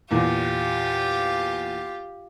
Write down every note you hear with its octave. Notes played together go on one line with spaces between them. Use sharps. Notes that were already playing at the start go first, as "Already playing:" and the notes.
E2 A#2 F4 G4